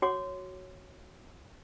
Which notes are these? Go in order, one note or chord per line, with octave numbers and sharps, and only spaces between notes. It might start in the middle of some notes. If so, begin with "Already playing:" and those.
F#4 C#5 D6